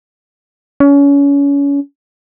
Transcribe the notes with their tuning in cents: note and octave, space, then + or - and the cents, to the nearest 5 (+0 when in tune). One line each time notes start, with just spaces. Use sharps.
C#4 +30